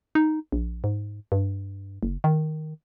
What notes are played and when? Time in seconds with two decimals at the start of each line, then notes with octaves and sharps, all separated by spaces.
0.15 D#4
0.52 A#1
0.84 G#2
1.32 G2
2.03 F#1
2.24 D#3